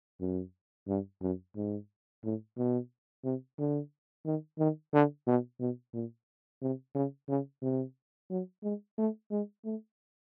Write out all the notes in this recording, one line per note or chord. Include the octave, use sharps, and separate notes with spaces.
F#2
G2
F#2
G#2
A2
B2
C3
D3
D#3
D#3
D3
B2
B2
A#2
C3
C#3
C#3
C3
F#3
G#3
A3
G#3
A3